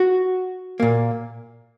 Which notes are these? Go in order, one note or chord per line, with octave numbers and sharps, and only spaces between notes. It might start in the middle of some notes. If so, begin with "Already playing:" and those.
Already playing: F#4
A#2 A#3